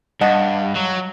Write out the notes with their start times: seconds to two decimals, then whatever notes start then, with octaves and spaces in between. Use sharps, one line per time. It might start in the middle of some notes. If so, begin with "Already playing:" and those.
0.21 G2 D#5 F#5 A5
0.76 F#3